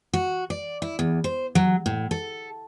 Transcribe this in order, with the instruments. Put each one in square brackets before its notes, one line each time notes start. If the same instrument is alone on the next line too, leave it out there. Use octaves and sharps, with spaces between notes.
[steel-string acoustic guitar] F#4
D5
E4
E2
C5
F#3
A2
A4